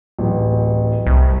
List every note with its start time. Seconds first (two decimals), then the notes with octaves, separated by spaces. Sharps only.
0.19 D1 A1
1.06 C2